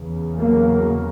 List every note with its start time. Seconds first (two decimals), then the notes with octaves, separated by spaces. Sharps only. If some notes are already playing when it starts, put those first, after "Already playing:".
Already playing: E2 C#3
0.37 F#3 A#3